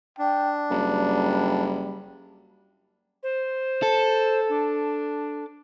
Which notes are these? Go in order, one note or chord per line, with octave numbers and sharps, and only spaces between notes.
D4 G5
F#1 G3
C5
A4
D4